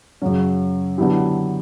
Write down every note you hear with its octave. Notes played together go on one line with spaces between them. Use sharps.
F#2 C#3 F#3 C#4
D3 F#3 B3 E4 G4